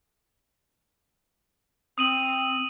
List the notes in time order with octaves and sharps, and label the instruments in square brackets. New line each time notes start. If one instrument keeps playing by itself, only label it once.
[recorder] C4 [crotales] D#6 D#7 F#7